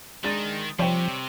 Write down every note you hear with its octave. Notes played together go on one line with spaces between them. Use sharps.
D#3 G#3 D4 A6
C3 F3 G3 C#5 G5